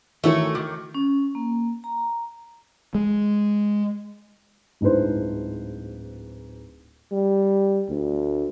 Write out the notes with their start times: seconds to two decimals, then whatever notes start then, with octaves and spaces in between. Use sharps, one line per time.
0.24 D#3 E3 A3 F#4 C#5
0.55 D#3 D6
0.94 C#4
1.35 A#3
1.84 A#5
2.95 G#3
4.81 D1 G#2 D4 E4 B4 C5
7.12 G3
7.89 D2